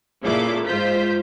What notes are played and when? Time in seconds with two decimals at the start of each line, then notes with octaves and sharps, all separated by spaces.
0.23 A#2 C#3 E4 A4 D6
0.65 G#2 F4 C5 G6 B6